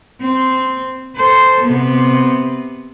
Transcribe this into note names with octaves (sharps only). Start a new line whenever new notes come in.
C4
A4 C5
C3 B3